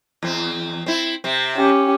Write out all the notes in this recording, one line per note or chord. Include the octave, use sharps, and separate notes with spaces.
E2 C4
C4 E4
C3 C4
C#4 G4